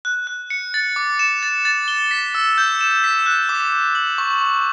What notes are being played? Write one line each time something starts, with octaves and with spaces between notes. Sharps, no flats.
F#6
F#6
C#7
A6
D6
E7
A6
A6
G7
B6
E6
G6
E7
B6
F#6
D6
D6
F#7
C#6
C#6